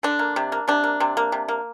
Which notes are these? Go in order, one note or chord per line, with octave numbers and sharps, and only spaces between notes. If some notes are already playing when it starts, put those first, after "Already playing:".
D3 D4
A#3
C3
A#3
C3 D4
A#3
C3
A#3
C3
A#3